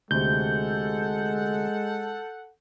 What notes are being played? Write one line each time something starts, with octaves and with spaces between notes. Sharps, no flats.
D2 C3 G#3 A4 F#5 G6